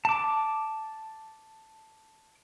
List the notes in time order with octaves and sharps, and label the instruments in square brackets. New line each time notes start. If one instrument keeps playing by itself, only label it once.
[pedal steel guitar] A5 D6